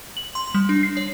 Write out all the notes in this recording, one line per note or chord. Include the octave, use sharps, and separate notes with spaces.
F#7
C6
G3
D4
C7
C#5